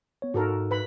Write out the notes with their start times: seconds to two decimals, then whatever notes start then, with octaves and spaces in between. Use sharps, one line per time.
0.22 B3 C#5
0.34 G#2 D#4 F#4 A4 A#4
0.71 B4 B5